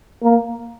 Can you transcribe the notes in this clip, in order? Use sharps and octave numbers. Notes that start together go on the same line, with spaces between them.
A#3